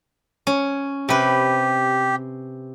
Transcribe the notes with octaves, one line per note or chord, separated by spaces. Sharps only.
C#4
C3 G4 B4